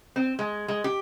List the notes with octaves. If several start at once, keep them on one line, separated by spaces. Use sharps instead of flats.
C4
G#3
G#3
G4